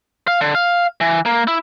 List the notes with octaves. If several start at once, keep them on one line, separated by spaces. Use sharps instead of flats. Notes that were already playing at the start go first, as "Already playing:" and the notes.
F5
D3
F5
E3
A#3
E4